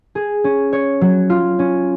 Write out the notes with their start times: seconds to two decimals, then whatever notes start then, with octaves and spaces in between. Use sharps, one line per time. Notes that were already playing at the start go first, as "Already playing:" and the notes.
0.15 G#4
0.44 C#4
0.73 C#5
1.01 F#3
1.30 F4
1.59 C#4